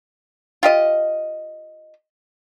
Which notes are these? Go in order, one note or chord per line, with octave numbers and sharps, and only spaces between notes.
F4 G4 D#5